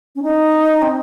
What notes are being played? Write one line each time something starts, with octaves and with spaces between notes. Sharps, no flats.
C#4
D#4
C4